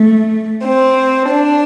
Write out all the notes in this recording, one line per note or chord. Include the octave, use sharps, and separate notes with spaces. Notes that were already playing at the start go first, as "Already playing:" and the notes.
Already playing: A3
C4
D4